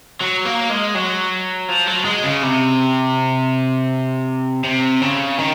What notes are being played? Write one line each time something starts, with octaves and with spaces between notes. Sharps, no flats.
F#3
A#3
G#3
F#3
F3
F#3
G#3
C#3
C3
C3
C#3
D#3